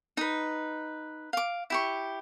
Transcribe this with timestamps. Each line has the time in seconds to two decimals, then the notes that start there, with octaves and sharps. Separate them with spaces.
0.17 D#4 B4
1.33 F5 D6
1.70 E4 G4 C#6